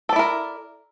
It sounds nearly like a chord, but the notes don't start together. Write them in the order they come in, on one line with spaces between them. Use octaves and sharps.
A4 D5 E4 A#4